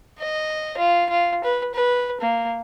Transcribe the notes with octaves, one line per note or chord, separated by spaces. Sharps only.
D#5
F4
F4
B4
B4
A#3